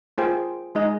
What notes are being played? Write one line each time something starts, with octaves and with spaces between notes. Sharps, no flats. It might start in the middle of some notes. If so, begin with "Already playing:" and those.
A#3 F4 G#4 C5 G5
G#3 D#4 G#4 D#5